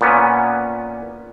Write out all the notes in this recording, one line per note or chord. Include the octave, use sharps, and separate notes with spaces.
A#2 B3 C#4